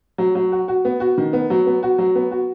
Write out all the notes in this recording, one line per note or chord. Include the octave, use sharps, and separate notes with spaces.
F#3
F#3
F#4
F#4
B3
F#4
D#3
B3
F#3
B3
F#4
F#3
B3
F#4